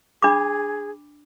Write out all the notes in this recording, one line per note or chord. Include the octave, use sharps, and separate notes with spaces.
D4 G#4 B5 D6